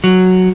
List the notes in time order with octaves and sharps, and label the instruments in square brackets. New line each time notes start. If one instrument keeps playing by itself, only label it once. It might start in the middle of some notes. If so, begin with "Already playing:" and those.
[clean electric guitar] F#3